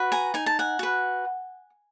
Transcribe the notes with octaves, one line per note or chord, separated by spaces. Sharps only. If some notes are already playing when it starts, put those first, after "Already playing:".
Already playing: F#4 B4
G#5 A#5
D#4 G#5
A5
F#5 G#5
F#4 B4